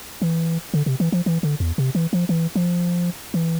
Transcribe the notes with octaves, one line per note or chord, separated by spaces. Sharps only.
E3
D3
C3
E3
F3
E3
D3
E2
C3
E3
F3
E3
F3
E3